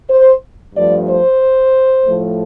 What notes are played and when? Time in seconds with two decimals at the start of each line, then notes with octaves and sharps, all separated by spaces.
0.09 C5
0.74 G2 F3 A3 D5
1.06 C5
2.03 A2 F3 A3